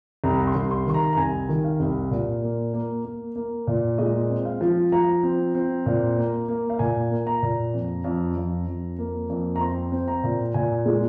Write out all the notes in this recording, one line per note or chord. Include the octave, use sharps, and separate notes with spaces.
C2 A#5
C6
C2
C6
D#3 C6
A#5
A#5
C2 G#5
D#3
F5
C2
A#2
A#3
A#3
A#3
A#3
A#2
G#3 D#5
C4
F5
F3
F3 A#5
C4
C4
A#2
A#3
A#3
F5
A#2 G#5
A#3
A#5
A#2
F2
F2
F2
F2
A#3
F2
A#5
C4 C6
C4
A#5
A#2
A#2 G#5
G#3